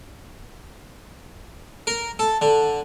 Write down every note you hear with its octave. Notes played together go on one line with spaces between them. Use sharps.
A#4
A4
D3